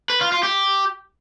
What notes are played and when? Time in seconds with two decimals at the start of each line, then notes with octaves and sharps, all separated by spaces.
0.10 B4
0.21 F4
0.32 F4
0.43 G4